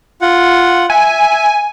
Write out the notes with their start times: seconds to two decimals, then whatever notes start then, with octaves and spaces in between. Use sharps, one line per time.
0.21 F4 F#5
0.90 E5 G#5